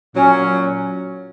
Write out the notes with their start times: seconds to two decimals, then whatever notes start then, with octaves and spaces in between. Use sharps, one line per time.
0.15 A#2 F#3 C#4